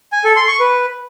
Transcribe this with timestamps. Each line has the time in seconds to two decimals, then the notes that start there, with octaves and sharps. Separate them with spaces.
0.12 G#5
0.24 A4
0.36 C6
0.48 C#6
0.60 B4